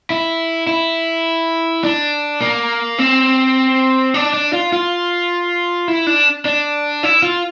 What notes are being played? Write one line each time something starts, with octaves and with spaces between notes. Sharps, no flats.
E4
E4
D4
A#3
C4
D4
D4
F4
F4
E4
D4
D4
E4
F4